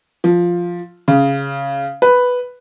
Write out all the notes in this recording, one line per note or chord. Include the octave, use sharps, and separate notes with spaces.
F3
C#3
B4